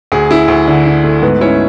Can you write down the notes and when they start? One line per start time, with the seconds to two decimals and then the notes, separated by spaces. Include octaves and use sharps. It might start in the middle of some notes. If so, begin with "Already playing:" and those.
0.12 D2 G#4
0.31 E4
0.48 D2
0.68 D3
0.86 D3
1.04 A3
1.22 G#2 B3 B4
1.41 C#4 E4 C#5